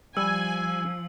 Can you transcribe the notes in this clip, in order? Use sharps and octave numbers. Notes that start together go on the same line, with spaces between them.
F3 G3 G#5 E6